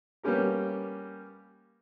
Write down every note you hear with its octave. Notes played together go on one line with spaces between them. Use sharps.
G3 A#3 B3 C#4 G4 A#4